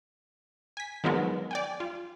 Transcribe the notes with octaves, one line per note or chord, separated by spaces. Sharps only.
G#5 B6
D#3 F3 F#3 G#3 B3 A#4
D5 G5 G#5
F4